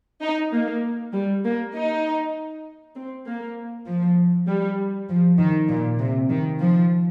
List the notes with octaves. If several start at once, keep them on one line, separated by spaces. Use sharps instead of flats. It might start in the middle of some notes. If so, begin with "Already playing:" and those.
D#4
A#3
G3
A#3
D#4
C4
A#3
F3
G3
F3
D#3
A#2
C3
D#3
F3